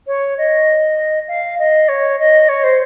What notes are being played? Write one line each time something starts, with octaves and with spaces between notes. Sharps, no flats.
C#5
D#5
F5
D#5
C#5
D#5
C#5
C5